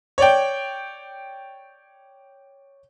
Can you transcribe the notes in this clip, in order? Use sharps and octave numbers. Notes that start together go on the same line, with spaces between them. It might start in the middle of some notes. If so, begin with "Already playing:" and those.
C#5 D5 G5